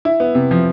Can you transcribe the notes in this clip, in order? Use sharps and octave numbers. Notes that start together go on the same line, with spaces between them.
E4
B3
C3
F3